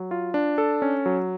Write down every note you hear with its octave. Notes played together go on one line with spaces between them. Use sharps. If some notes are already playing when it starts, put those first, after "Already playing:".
Already playing: F#3
F4
D4
A4
C#4
F#3